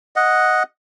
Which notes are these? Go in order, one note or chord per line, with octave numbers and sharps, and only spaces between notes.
D#5 F#5